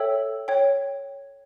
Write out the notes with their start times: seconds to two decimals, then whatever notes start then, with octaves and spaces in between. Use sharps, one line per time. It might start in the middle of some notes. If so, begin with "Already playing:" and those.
Already playing: A4 C#5 E5 G5 E6
0.48 C#5 G5